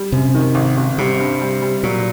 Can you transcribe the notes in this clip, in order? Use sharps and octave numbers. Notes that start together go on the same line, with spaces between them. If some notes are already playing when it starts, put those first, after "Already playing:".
Already playing: G3
F#2 C3
D#3
G#1
G#1
C3 G3
G2
G3
G3
A#2 F#3